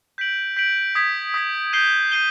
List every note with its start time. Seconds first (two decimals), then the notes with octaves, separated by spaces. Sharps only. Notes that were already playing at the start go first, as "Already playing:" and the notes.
0.18 G6 B6 D7 F#7
0.56 G6 B6 D7 F#7
0.95 D#6 G#6 B6
1.34 D#6 G#6 B6
1.73 G6 C7 D#7 G7
2.12 G6 C7 D#7 G7